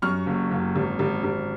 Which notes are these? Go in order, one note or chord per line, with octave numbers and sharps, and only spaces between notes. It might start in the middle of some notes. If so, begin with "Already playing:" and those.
F#2 C#6 F6
F#1
F#1
G#1
G#1
G#1